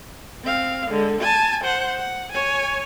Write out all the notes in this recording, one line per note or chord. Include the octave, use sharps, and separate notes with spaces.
C4 F5
D3 G#3
G#5 A5
C5 F#5
F#5
C#5 G#5